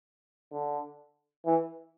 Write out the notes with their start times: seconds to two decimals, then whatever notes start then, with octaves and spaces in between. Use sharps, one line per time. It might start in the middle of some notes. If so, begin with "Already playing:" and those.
0.52 D3
1.46 E3